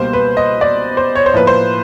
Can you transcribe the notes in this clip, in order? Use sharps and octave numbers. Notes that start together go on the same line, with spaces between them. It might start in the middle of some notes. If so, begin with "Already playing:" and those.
Already playing: C#2 B2 G3 A#3 C5
B4
D#5
D5
C5
C#5
C5
A2 F3 A#3 B4
C5